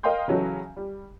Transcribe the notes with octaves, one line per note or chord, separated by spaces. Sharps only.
A#4 D#5 F5 G5 C6 G6
C#3 E3 F#3 C#4 F#4 A4
G3